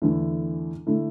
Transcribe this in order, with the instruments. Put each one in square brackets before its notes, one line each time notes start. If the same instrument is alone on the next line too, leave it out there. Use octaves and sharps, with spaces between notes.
[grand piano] E2 D3 A3 E4
D3 A3 E4